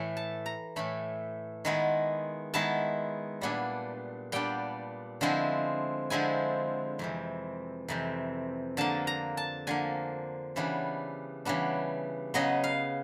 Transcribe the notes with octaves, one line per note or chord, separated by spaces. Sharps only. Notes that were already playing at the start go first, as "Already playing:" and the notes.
Already playing: A2 E3 A3
A5
A#5
A2 E3 A3 B5
D#3 G#3 B3 E4
D#3 G#3 B3 E4 A5
A#2 G3 B3 D4 G#5
A#2 G3 B3 D4 G5
D3 F3 G#3 C4 E4
D3 F3 G#3 C4 E4 G#5
F2 C3 E3
F2 C3 E3
D3 F3 A#3 A5
A#5
A5
D3 F3 A#3 G#5
C#3 E3 G3 B3 D4
C#3 E3 G3 B3 D4
C#3 F#3 B3 D#5
F5